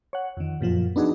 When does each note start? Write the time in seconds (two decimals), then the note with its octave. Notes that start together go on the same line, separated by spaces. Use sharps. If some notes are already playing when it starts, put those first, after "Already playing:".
0.13 C#5 F#5
0.37 F2 D#3
0.61 F#2 A#2 F3 F4
0.96 B3 D4 D#4 F#4 G#4